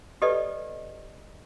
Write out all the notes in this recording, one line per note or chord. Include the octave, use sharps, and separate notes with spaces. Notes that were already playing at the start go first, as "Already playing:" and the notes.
G4 A4 B4 D5 D#5